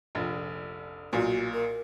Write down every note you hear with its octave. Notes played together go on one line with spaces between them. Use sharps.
F1 A#1
B1 A#2 F#4
A#4